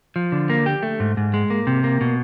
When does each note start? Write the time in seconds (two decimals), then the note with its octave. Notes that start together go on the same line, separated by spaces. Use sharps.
0.16 F3
0.32 D3
0.50 A#3
0.66 G4
0.83 A3
1.00 G#2
1.17 G#2
1.34 G#3
1.50 A#3
1.67 C3
1.84 A#3
2.01 B2